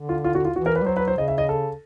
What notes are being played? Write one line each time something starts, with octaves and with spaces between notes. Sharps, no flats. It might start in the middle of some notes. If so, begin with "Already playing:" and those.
Already playing: D3
F4
F4
F#4
F4
E3 F#4
A#4
B4
G3
F#3 C5
B4
C5
C#3 D#5
E5
D#5
A4